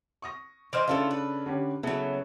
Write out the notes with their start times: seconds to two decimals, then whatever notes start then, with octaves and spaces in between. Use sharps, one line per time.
0.22 C#6 D#6 A#6
0.73 E3 C5 D#5 F6 D7
0.88 C#3 A3 D4 E4 F4 A4
1.11 B4
1.46 D3 C#4 G4
1.83 C#3 F#3 B3 E4 A4